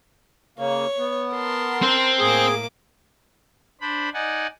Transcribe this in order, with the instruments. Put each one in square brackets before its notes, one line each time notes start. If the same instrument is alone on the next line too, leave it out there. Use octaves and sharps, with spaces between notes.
[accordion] C#3 A#3 [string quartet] C#5
[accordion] B3
[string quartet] A#4 A5 C6
[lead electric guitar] C4 C5
[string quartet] A2 A#3 D6 [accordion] G#4
[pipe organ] D4 C5 B5
D#4 D5 F#5 G#5